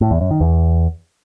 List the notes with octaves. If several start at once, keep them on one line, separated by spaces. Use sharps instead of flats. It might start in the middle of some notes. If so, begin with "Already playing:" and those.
A2
E2
F#2
D#3
E2